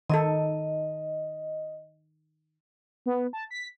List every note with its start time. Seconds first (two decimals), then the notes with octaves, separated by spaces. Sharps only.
0.10 D#3 D#4 A4 D#5
3.06 B3
3.33 A5
3.51 B6